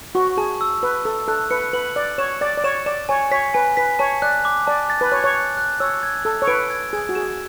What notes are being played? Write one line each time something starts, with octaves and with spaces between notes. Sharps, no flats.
F#4 C#6
G#4 A5
E6
B4 E6
A4 E6
A4 F#6
B4 C#7
B4 F#7
D5 F#6
C#5 E7
D5 A6
D5
C#5 E7
D5 E7
C#5 G#5
C#5 B6
B4 G#5
B4 B6
C#5 A5
D5 F#6
D6
D5 A5
A6
B4
C#5 F#6
C#5
F#6
F#6
C#5 E6
G#6
A4 E6
C#5
B4 D7
G#6
G#4 G#6
F#4
G#4 E7